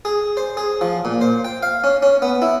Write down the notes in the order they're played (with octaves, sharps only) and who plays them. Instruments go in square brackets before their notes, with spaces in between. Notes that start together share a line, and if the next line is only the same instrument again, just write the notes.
[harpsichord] G#4
C5
G#4
F3
A#2
C5
G5
F5
C#4
C#4
B3
E4